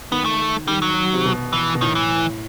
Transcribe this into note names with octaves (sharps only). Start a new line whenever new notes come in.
D#3 B3
A3
D#3 G3
F#3
C3
B2
E3
B2
A2 D#3
E3